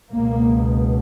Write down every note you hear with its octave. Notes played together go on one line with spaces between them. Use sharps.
C#2 B2 A#3